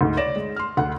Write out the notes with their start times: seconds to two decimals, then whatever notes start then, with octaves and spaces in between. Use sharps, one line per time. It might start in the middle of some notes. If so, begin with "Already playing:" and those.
0.01 D2 G#2
0.17 C#5 D5 A#6 E7
0.36 G#3
0.56 C6 F6
0.77 D2 F#5